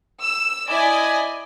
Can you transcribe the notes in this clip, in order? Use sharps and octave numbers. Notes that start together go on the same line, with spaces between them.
E6
E4 D5 D#5 G#5